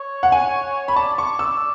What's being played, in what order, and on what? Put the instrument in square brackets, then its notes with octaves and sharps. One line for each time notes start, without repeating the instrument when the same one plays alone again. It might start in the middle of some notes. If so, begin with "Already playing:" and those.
Already playing: [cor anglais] C#5
[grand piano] F#5
G#5
B5
[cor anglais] D5 [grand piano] A5
[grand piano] C#6
E6